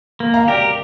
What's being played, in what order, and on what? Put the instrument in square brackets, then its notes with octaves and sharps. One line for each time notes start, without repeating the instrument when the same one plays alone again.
[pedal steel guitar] A#3
[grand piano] F5 A#5
[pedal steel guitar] G4 A#4 [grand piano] D5 G5